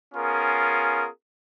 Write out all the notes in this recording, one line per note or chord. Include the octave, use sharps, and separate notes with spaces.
B3 C#4 F4 G#4 A#4